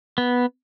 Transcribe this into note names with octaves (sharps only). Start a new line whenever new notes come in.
B3